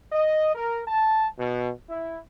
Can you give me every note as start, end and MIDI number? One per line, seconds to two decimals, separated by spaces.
0.12 0.55 75
0.55 0.81 70
0.88 1.26 81
1.38 1.69 47
1.89 2.19 64